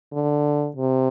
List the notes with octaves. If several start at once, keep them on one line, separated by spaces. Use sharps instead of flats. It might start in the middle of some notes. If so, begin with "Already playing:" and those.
D3
C3